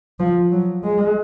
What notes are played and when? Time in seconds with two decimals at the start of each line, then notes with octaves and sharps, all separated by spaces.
0.19 F3
0.52 F#3
0.84 G#3